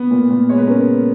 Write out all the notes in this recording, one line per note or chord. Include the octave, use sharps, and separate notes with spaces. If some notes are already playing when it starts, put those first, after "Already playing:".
Already playing: B3
A#2
A#2
G#3 C#5
B4
C#4 A#4